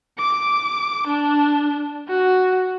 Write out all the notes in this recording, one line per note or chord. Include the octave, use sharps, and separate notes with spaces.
D6
D4
F#4